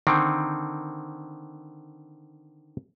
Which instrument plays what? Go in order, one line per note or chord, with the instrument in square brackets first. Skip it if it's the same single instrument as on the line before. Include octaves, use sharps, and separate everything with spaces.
[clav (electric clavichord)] D3 D#3 C4